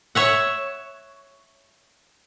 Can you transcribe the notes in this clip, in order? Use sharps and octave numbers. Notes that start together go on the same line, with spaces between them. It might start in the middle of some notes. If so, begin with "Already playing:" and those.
C#5 E5 F#5